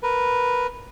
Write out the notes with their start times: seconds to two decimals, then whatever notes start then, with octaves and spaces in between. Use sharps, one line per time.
0.03 A#4 B4